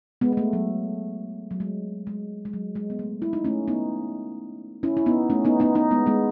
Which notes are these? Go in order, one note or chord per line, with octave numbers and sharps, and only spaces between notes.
G#3 B3
B3
A3
F#3
F#3
G#3
G#3
G#3
F#3
G#3
B3
A3
E4
D#4
A3 C#4
B3 D#4
C#4 E4
E4
B3 D#4
A3 C#4
B3 D#4
B3 D#4
B3 D#4
G#3 B3
G#3 B3